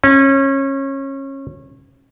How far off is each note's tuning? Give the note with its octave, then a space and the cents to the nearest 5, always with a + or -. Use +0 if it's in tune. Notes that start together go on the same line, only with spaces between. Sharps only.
C#4 -25